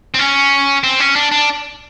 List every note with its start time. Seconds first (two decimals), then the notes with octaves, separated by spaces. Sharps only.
0.14 C4
0.19 C#4
0.83 C4
1.00 C#4
1.16 D4
1.32 D4